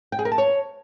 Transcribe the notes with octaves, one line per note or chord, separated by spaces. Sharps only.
G5
G#4
A#4
A5
C#5